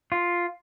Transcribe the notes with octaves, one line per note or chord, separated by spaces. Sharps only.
F4